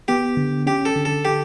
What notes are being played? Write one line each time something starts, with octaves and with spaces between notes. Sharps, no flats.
B3 G4
D3
C#4 G4
A4
D3
A4
G4 A4